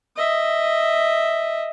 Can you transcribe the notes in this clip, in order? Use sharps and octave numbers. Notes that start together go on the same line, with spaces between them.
D#5 E5